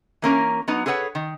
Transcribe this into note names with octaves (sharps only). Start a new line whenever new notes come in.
E3 A#3 C#4 A#4
F#3 B3 D#4
G#4 A4 B4 C#5 F#5
D#3